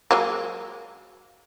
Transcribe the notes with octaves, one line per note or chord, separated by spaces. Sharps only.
F#3 G#3 A#3